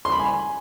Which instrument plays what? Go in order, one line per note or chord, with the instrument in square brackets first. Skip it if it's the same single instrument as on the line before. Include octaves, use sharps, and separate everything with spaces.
[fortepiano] C6
B5
G#5